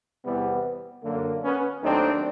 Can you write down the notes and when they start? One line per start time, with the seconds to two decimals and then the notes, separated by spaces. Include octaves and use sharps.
0.24 E2 C3 E3 G3 B3
1.04 F#2 D3 F#3 A#3
1.43 B3 C#4
1.83 D#2 D#3 F#3 A3 C4 D4